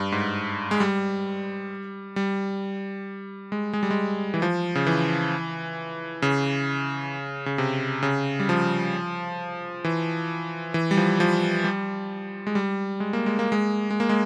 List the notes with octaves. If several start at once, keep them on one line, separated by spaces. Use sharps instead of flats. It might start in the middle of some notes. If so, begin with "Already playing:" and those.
Already playing: G2
G#2
G#3
G3
G3
G#3
G#3
G3
G#3
E3
F3
C#3
E3
C#3
C#3
C3
C#3
G3
F3
E3
E3
G3
F3
F3
G3
G#3
G3
G#3
A#3
G#3
A#3
G#3
G#3
A#3
G#3